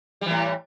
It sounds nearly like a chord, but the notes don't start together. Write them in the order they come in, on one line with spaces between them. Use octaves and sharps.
G3 E3 A2